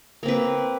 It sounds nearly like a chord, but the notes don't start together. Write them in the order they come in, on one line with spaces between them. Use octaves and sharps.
A#3 C4 B4